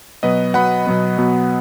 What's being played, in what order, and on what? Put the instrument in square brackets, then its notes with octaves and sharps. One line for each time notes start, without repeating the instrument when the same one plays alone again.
[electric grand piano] B2 F#3 B3 B4 D#5
B2 F#3 B3 F#5 B5
B2 F#3 B3
B2 F#3 B3